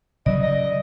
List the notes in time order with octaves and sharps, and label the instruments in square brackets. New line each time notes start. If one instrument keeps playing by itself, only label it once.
[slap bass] C#3 F#3 G3 [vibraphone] D5 [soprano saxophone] D#5
[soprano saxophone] D#5